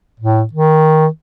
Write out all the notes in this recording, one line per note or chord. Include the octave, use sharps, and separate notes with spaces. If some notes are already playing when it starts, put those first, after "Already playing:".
A2
D#3